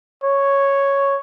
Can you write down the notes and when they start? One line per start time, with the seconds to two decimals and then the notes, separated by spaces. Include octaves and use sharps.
0.24 C#5